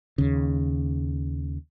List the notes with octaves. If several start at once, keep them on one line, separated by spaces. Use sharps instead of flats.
D#2 C#3